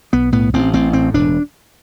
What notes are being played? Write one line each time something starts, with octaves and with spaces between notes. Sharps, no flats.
B1 B3
A2 B3
A1 C4
A1 C4
A2 C4
E1 D4